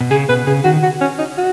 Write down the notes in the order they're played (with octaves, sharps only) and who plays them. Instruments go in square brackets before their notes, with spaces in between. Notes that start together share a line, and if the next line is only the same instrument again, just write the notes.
[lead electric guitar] B2
[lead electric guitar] C#3 [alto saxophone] G#4
[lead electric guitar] B2 [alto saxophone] B4
[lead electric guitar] C#3 [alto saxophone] G#4
[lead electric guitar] D#3 [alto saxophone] F#4
[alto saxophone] F#4
C#4
D#4
F#4